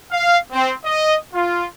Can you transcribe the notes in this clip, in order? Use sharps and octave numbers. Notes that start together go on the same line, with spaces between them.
F5
C4
D#5
F4